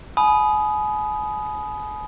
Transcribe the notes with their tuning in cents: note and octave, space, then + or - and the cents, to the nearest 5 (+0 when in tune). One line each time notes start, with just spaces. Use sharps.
G#5 +35 B5 +0 D#6 +0